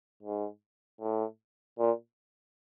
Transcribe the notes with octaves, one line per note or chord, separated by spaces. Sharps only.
G#2
A2
A#2